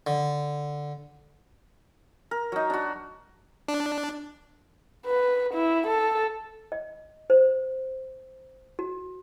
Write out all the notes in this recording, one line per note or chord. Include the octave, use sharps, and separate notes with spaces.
D3
A#4
F#3 D#4
D4 F#4
D4
B4
E4
A4
D#5
C5
F#4